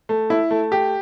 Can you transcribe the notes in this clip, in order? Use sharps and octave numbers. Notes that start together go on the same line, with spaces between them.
A3
E4
A3
G4